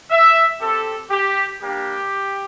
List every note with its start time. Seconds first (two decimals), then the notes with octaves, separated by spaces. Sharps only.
0.11 E5
0.60 C4 G4 A4
1.10 G4
1.61 G3 A#3 D4 G4